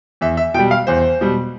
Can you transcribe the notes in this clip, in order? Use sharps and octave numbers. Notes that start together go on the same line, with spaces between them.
E2 E5
E5
B2 G3 G5
F5
E2 C5
B2 G3